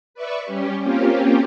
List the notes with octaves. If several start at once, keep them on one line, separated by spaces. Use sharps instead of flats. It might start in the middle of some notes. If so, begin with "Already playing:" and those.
B4 D5 E5 C#6
G3 C#4 G4
A#3 C4 C#4 F4 G4